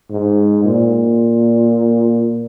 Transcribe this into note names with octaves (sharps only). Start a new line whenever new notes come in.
G#2
A#2